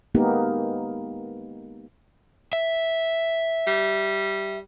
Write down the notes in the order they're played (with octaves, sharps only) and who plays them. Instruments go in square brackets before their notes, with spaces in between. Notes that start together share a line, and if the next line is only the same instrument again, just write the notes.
[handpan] G#3 A#3 B3 D#4 G4 A#4
[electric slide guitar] E5
[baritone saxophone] G3